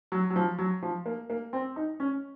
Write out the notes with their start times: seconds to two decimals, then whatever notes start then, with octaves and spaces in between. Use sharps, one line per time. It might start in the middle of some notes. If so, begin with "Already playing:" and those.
0.12 F#3
0.30 F#3
0.36 F3
0.58 F#3
0.82 F3
1.06 A#3
1.30 A#3
1.53 C4
1.76 D#4
2.00 C#4